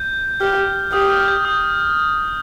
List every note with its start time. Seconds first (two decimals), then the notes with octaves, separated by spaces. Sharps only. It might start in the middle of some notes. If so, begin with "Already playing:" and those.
Already playing: G6
0.41 G4 F6
0.93 G4 D#6
1.10 F6
1.28 G6
1.45 D#6